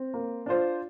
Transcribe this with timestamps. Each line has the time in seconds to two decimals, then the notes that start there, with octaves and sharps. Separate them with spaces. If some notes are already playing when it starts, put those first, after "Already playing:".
Already playing: C4
0.14 A#3
0.46 D4 F4 C5